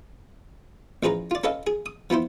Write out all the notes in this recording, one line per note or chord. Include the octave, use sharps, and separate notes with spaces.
A1 F3 G#4 B4 A#5
F4 D5
C#4 A4 B4 D#5 F5
G#4
D#6
F3 B3 E4 C5